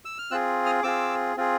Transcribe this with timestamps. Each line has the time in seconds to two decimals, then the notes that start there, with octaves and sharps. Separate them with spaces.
0.05 E6
0.18 F6
0.31 C4 F4 G#4 E6 F#6
0.66 D#6 F6
0.83 C4 F4 G#4 D6 E6
1.37 C4 F4 G#4